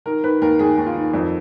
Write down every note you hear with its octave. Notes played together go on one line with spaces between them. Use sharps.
D#3 A#4
D#3 B4
D#2 A#4
D#2 G#4
D#2
F4
D#3
F2 D#4